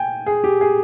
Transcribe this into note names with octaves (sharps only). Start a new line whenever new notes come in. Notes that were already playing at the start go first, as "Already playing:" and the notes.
Already playing: G5 G#5
G#4
G4
G#4